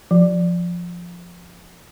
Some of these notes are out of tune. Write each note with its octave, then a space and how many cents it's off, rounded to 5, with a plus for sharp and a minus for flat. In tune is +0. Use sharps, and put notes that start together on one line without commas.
F3 +0